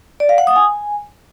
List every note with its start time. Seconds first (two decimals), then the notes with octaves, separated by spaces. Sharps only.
0.20 D5
0.29 F5
0.38 F#5
0.47 D#6
0.56 G#5